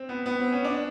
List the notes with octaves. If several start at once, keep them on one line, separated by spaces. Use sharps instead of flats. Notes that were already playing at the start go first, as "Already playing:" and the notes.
Already playing: C4
B3
B3
C4
C#4
D4